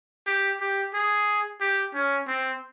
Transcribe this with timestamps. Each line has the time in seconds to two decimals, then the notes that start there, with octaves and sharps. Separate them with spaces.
0.27 G4
0.61 G4
0.94 G#4
1.61 G4
1.94 C#4
2.28 C4